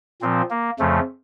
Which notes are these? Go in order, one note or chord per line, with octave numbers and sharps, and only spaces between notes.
A#2 F3 C4
A#3
F2 C#3 F3 A3